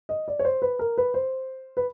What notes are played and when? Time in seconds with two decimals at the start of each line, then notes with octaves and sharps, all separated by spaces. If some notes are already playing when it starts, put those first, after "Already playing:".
0.09 D#5
0.28 D5
0.39 C#5
0.45 C5
0.62 B4
0.79 A#4
0.98 B4
1.14 C5
1.77 B4